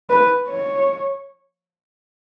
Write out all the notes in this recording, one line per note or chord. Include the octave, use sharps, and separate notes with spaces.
B4
C#5